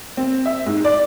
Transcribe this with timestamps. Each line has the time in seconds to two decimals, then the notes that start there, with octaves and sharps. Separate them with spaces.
0.17 C4
0.45 E5
0.66 G#2
0.85 D5